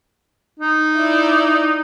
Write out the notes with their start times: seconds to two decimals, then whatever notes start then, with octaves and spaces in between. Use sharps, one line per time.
0.59 D#4
0.96 E4 D5